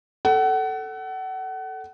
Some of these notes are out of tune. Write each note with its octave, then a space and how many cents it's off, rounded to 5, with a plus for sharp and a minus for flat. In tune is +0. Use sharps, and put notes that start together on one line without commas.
A4 +0 F#5 +30